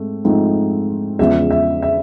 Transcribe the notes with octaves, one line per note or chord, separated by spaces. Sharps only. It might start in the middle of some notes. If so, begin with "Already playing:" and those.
Already playing: G#2 A3 C4
G#2 F3 A3 C4 D#4
E2 C#3 F3 G#3 B3 E5
E5
E5